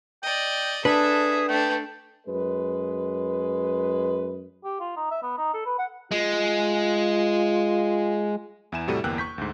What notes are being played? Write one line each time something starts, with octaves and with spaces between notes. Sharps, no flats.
D5 D#5 G5
D4 G#4 A4 B4 E5
A3 D4 G5
F#2 G#3 B4
G4
F4
D#4
E5
B3
D#4
A4
B4
F#5
G#3 F4
E2 E4 G#5 E7
A2 C3 G3 F#4 A4 D#7
G1 E2 A#3 G5 E6 F#6
C#6 G6 B6
D2 G#2